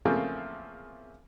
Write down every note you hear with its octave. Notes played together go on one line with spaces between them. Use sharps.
E2 C#3 F3 A3 A#3 C4